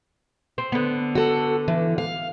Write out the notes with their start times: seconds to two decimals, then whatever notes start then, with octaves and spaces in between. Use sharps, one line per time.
0.58 C4
0.72 D3 B3
1.15 F#4 A4
1.68 E3
1.98 F5